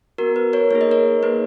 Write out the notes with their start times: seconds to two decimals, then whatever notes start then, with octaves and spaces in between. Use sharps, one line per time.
0.18 B3 F#4 A#4
0.36 B4
0.53 A#4 C#5
0.71 A#3 D#4 G#4 C#5
0.81 D#5
0.91 A#4 C#5
1.23 A#3 D#4 G#4 B4